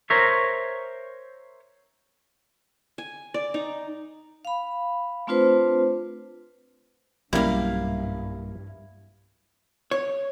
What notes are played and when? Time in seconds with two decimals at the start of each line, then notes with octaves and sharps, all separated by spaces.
0.10 A#4 C5 C#5 E5
2.98 G#5
3.34 D5
3.54 D#4
4.45 F5 B5
5.27 A3 C4 D4 F4 B4 C5
7.33 B1 G2 F#3 G3 A#3 C#4 E4 F5
9.91 C#5